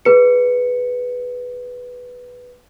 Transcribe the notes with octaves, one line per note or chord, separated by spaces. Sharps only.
G#4 B4 C#7